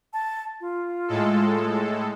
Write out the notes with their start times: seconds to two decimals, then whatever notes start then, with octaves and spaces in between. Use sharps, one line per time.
0.13 A5
0.61 F4
1.08 A2 G#3 A4